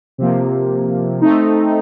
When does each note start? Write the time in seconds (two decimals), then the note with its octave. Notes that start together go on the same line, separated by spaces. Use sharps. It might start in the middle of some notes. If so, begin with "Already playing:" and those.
0.18 C3 F3 A#3
1.21 A3 C4 D#4